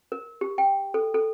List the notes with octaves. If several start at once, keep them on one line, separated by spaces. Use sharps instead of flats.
A#4
G4
G5
A4
A4